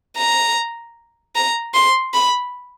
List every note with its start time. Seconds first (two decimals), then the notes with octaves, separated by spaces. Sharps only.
0.17 A#5
1.35 A#5
1.74 C6
2.14 B5